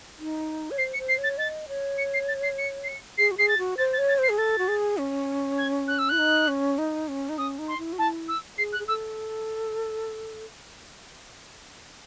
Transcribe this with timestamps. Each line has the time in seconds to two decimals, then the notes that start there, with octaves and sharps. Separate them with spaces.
0.19 D#4
0.71 C#5
0.78 C5 C7
0.94 C#7
0.98 C5
1.08 C7
1.18 C#5
1.23 A6
1.38 D#5 A6
1.68 C#5
1.98 C#7
2.14 C7
2.28 A6
2.43 C7
2.58 C#7
2.84 C7
2.88 C#7
3.18 G#4 C7
3.31 F#4
3.38 G#4 C7
3.48 A6
3.58 F#4
3.78 C5 A6
3.93 A6
3.98 C#5
4.08 A6
4.18 C5 C7
4.29 G#4
4.38 A4 A6
4.58 F#4
4.68 G#4
4.98 C#4
5.58 G#6
5.88 F#6
5.98 E6
6.09 E4 F#6
6.19 D#4
6.48 C#4
6.78 D#4
7.08 C#4
7.29 D#4
7.38 C#4 D#6
7.59 D#4
7.68 C6
7.78 E4
7.93 F#4
7.98 E4 A5
8.28 E6
8.58 G#4 C7
8.73 F#6
8.79 G#4
8.87 A4 E6